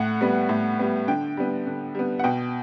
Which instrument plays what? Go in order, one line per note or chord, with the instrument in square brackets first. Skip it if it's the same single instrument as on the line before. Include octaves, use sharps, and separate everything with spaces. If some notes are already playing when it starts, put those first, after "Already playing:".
Already playing: [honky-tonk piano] A2 F#5
G3 B3
A2
G3 B3
D3 G5
G3 B3
D3
G3 B3
F#5
B2 G5